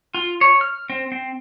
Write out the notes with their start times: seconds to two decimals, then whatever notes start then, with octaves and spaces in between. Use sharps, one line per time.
0.14 F4
0.41 C#5
0.61 F6
0.90 C4
1.12 C4